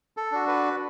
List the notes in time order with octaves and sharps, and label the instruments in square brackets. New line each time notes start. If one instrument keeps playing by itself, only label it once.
[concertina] A4
D4 F#4
B4